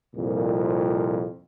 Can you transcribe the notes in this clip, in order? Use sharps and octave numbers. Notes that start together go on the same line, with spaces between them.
C2 F2 A#2